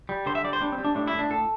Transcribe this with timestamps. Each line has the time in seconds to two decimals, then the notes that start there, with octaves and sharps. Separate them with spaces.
0.09 G3
0.26 D3 C5
0.35 E5
0.44 G3 D5
0.53 C5
0.61 G3 D4
0.72 C4
0.78 G3
0.84 D4
0.95 A2 D4
1.08 A2 E4
1.19 D4
1.30 A2 A4